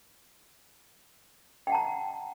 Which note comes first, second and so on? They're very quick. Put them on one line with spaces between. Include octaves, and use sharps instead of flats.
G5 F#5 A5 A#5